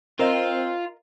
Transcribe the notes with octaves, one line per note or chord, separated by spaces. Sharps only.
C4 F4 A#4 D#5